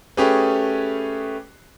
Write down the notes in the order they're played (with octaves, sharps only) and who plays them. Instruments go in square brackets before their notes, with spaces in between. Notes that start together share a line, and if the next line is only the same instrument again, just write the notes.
[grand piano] A3 C#4 G4 G#4 B4